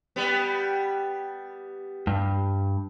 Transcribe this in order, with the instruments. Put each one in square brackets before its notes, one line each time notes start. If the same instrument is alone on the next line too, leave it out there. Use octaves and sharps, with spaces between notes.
[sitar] G3 B3
[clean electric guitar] G2